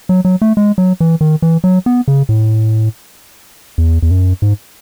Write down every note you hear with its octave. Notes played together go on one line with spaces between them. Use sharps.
F#3
F#3
A3
G#3
F#3
E3
D#3
E3
F#3
B3
C#3
A2
E2
E2
F#2
G#2